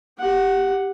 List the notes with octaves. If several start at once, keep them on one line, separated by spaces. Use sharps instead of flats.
G4 F#5